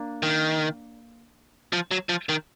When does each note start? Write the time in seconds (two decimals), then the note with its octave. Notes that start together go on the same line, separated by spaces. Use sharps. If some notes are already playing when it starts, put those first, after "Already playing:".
Already playing: A#3 D4
0.23 D#3
1.73 F3
1.91 F#3
2.09 F3
2.29 D#3